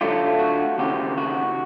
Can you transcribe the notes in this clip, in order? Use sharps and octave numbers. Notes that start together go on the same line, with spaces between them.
D3 F#3 A3 D4 F4 G4
F#4
D#2 C#3 E3 G4
F#4